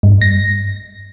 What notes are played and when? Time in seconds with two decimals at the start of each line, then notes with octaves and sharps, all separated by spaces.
0.03 G2
0.22 A#6